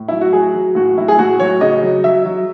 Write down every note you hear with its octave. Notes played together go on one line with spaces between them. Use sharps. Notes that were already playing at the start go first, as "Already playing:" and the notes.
Already playing: A2
F#3 E4
F#4
F#3 G#4
F#3
A2 F#4
F#3 E4
G#4
A2 F#4
F#3 C#5
C#3 D#5
F#3
F#3 E5
F#3